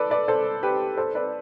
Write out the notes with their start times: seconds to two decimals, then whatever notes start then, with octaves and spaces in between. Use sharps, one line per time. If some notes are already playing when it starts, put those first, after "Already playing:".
Already playing: A4 B4 D5
0.10 B4 D5
0.28 A4 C5
0.63 G4 B4
0.97 A4 C5
1.15 B4 D5